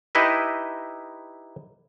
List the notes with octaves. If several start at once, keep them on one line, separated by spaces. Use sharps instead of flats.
D#4 E4 G4 B4 D#5 E5